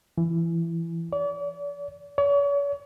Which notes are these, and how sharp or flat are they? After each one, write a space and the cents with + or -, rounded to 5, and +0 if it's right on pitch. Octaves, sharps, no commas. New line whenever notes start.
E3 +20
D5 -40
C#5 +40